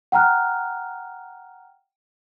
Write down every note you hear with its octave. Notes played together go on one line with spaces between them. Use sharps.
F#5 G5 A#5 F6 F#6